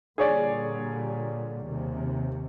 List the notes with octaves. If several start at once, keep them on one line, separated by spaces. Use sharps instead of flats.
A#2 D3 G3 G#4 C#5 D5
D#2 C3